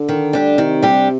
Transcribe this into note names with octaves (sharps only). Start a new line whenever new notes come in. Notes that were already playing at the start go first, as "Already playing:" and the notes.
Already playing: D3
D#3
G3 D4 G4
C3 D#3
G3 D4 G4